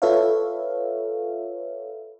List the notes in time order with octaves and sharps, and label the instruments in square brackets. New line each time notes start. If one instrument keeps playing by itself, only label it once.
[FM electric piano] F4 A4 B4 C#5 E5 F5